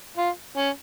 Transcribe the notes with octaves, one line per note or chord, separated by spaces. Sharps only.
F4
C#4